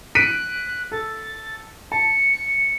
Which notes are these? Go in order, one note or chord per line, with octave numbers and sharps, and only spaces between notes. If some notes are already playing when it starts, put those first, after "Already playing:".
F#6 B6 D7 D#7
A4 A6
A5 C#7